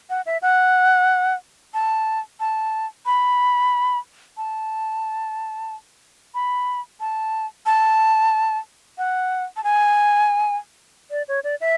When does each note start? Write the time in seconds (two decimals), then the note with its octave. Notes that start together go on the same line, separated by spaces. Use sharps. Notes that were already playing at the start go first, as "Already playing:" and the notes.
0.10 F#5
0.26 E5
0.42 F#5
1.74 A5
2.40 A5
3.06 B5
4.37 A5
6.35 B5
7.00 A5
7.66 A5
8.98 F#5
9.57 A5
9.64 G#5
11.11 D5
11.28 C#5
11.44 D5
11.61 E5